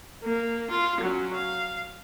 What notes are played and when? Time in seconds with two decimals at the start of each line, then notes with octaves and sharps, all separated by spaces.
0.24 A#3
0.71 F4
1.01 F#3 C#4
1.34 F5